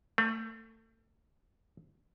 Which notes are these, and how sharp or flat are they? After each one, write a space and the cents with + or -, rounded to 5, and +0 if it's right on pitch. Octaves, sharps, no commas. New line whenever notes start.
A3 +30